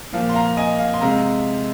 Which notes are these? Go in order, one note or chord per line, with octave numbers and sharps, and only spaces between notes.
A#2 F3 A#3 F5
C6
F5 A#5
D#5 G#5
F5
C6
C3 G#3 F5 A#5